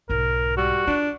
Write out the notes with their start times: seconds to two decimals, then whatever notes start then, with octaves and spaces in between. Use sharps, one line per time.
0.09 B1 G#2 A#4
0.57 G3 F#4
0.87 D4 F4